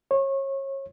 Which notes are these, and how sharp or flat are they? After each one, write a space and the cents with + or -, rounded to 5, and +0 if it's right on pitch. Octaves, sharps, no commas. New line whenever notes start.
C#5 -30